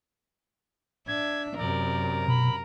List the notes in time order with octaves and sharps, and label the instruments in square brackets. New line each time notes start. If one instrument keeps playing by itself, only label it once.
[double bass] D4 [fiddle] E5 [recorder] G#6
[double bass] F#2 C3 [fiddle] A#4 [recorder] D5
[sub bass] B2 [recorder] B5